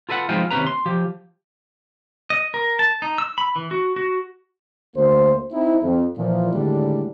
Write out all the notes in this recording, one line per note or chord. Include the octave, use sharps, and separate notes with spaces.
F4 A4 B4 E5 F#5
F3 G#3 B3 C4 D#4 F4
D#2 C3 A#3 C#4 B4 A#5
C6
F3 G4
D#5
A#4
A5
D#4
E6
B5
E3
F#4
F#4
D2 A#3 C5
C4 D#4 E4
F2
A#2 E3 F3
D#2 A2 D3 G3 G#3 D4